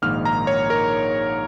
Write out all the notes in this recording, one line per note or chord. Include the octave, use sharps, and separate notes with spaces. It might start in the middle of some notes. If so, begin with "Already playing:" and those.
A#1 G#2 D#3 A#3 D#4 F6
A#5
C#5
A#4